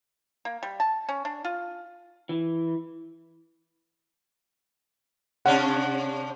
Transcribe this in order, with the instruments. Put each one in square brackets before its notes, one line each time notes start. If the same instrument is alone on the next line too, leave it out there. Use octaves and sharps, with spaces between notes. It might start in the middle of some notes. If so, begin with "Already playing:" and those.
[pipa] A#3
G3
A5
C#4
D4
F4
[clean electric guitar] E3
[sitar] C3 C#4 D4 [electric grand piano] F#5